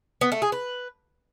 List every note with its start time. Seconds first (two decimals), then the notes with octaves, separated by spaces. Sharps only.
0.21 B3
0.32 A3
0.42 G#4
0.52 B4